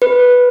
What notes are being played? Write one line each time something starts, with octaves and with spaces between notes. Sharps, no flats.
B4